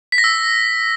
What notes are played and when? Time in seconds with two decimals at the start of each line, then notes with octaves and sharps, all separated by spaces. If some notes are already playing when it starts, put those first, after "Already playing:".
0.12 B6
0.18 A#6
0.24 E6